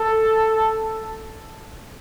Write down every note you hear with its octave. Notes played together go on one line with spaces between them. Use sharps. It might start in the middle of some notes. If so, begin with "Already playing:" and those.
Already playing: A4